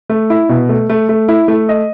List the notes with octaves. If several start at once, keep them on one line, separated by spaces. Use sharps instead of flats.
A3
E4
B2
A3
A3
A3
E4
A3
D#5